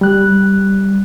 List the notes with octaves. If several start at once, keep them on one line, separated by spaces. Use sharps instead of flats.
G3 F#6